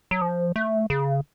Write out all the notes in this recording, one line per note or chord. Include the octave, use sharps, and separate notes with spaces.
F#3
F3
A3
C#3